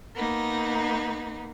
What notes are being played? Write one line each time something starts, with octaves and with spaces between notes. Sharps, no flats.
A#3 B3 D#4